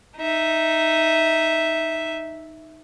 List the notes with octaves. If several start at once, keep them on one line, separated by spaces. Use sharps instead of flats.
D#4 E5